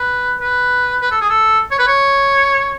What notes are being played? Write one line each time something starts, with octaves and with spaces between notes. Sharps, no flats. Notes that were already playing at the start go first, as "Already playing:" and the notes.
Already playing: B4
B4
B4
A4
G#4
A4
C#5
B4
C#5